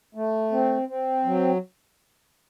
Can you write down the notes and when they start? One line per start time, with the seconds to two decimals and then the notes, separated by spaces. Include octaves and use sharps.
0.15 A3
0.52 C4
0.88 C4
1.25 F#3